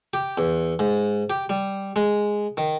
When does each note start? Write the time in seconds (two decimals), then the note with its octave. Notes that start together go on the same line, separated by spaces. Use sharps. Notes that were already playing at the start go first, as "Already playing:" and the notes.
0.13 G4
0.38 E2
0.79 G#2
1.30 G4
1.49 G3
1.96 G#3
2.57 D#3